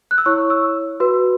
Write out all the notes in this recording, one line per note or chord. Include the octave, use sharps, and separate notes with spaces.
F#6
E6
E4 C#5 C#6
E6
F#4 B4